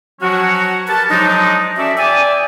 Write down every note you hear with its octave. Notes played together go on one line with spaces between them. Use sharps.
F3 F#3 C#4 F#4
G4 A#4 B4 A5
F3 F#3 G#3 D4 D#4
C#4 F#4 A4 D5 E5
G#4 D5 E5 G5 G#5